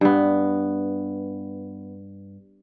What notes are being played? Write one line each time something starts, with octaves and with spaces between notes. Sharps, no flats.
G2 B3